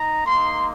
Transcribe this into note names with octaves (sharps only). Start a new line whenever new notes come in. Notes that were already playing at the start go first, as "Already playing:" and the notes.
Already playing: D#4 A#5
A#3 D#4 C6